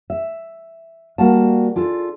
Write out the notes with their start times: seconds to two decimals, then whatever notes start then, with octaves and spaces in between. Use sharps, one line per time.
0.10 E5
1.18 G3 A#3 F#4 F5 F#5 A5
1.76 D4 F4 G#4 A4